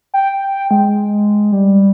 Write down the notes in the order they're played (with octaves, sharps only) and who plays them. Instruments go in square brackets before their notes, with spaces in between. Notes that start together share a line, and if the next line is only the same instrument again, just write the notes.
[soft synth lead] G5
G#3
G3